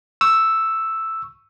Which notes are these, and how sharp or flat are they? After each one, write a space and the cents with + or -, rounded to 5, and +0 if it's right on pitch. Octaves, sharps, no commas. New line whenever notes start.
C#6 +0 E6 +0